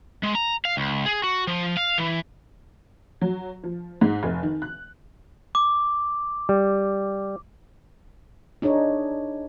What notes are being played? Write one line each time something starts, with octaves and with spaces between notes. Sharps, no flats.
G#3
A#5
F5
C#2
G#4
F#4
F3
F5
E3
F#3
F3
G#2
F1
D#3
F#6
D6
G3
D4 D#4 G#4 C#5 D#5